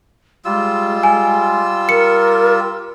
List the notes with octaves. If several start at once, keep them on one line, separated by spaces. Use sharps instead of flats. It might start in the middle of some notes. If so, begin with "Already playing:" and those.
G3 G#3 F4 E6
G#5
A#4 C#7